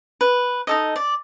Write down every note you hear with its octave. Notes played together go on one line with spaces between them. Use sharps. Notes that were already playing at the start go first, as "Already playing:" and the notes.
B4
D#4 A4 D#5
D5